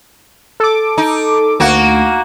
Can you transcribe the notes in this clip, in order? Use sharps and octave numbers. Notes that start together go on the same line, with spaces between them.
A4 D6
D#4
D2 A#3 F#4